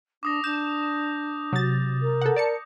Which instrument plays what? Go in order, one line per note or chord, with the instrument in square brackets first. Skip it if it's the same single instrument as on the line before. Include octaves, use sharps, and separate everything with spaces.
[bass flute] D4 [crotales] D6 D#6 A#6
[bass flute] D4 [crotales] G6 [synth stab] E7
[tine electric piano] C3 [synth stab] F#3 A6
[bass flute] A#4
[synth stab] A4 F#5
D5 A5 C#7